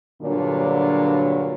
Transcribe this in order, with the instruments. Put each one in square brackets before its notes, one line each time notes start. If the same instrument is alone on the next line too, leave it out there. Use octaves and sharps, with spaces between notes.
[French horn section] G2 A#2 D3 F#3